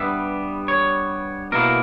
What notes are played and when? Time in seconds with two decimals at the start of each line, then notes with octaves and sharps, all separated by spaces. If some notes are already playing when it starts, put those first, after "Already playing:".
Already playing: G2 G3 B3 E5
0.68 C#5
1.52 B2 A#3 E4 A#4